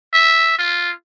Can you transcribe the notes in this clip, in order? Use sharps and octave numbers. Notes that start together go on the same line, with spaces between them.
E5
F4